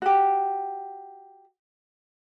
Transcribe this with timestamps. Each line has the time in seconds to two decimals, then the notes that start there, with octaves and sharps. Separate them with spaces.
0.02 F#4 G4